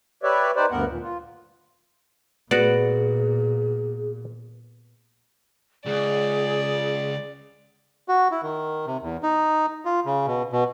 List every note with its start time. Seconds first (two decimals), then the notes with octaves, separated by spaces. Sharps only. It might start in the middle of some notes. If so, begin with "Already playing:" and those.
0.23 G4 B4 C#5 D5 E5
0.56 D#4 G4 B4 C5 D5
0.71 D2 G2 B3 A#4 F#5
0.88 D#2 A#2
1.02 F4
2.51 A#2 B3 F#4 G#4 D5
5.86 C#2 G#4 D5
8.08 F#4
8.31 E4
8.43 D#3
8.87 C3
9.03 E2
9.23 D#4
9.85 F4
10.06 C#3
10.27 B2
10.53 B2